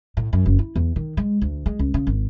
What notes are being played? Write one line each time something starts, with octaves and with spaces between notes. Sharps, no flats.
A2
F#2
F#1
E4
E2
D#3
G#3
D2
G#3
C#2
C#3
G#1